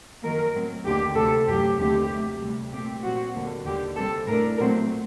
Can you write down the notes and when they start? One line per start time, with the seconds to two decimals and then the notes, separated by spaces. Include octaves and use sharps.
0.22 F#2 D#3 F#3 A#3 A#4
0.54 A2 F#3 C4
0.84 D#2 D3 A3 G4
1.15 D2 C3 F#3 C4 A4
1.47 F#2 F#3 A3 G4
1.78 D#2 D3 A3 C4 G4
2.10 C3 F#3 A3
2.40 D2 C3 G3
2.71 A#2 A3 C4 G4
3.02 A#2 F#3 C4 F#4
3.34 D#2 D3 G3 A#3
3.65 D#2 D3 G3 G4
3.96 C3 G3 C4 A4
4.27 A2 A3 D4 A#4
4.58 A#2 F#3 A3 C4 A#4